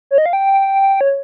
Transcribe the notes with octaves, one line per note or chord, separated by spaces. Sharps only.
C#5
D#5
F5
G5
C#5